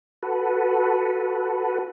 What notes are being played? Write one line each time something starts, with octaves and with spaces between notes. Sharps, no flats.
F#4 A4 B4